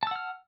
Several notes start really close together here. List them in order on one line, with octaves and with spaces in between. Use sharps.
A5 E6 F#5 F6